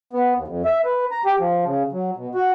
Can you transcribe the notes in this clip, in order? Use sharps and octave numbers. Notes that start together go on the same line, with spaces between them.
B3
D#2
F2
E5
B4
A#5
G4
F3
C#3
F#3
B2
F#4